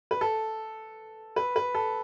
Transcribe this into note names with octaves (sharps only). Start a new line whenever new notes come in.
B4
A4
B4
B4
A4